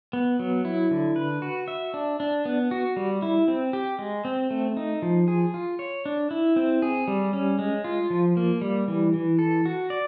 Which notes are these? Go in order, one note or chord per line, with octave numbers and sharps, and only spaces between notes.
B3
F#3
E4
D3
B4
F#4
E5
D4
D4
B3
F#4
G3
E4
C4
G4
G#3
C4
A3
D#4
F3
G#4
F4
C#5
D4
E4
C4
G#4
G3
C#4
G#3
F4
F3
A#3
G3
E3
E3
A4
F#4
D5